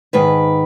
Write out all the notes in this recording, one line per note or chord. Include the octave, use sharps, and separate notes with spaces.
G#2 D#3 B4